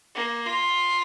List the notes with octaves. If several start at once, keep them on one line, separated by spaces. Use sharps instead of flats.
A#3
F4